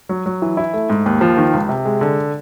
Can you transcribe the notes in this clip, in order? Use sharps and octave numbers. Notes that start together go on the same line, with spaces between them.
F#3
F#3
E3
E4
A3
G#2
D#2
F3
D#3
C#2
C3
G#3
D3